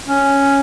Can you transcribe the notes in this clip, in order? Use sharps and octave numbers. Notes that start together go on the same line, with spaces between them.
C#4